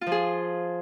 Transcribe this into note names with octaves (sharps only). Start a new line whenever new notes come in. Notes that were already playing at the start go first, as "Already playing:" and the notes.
F4
F3
G#4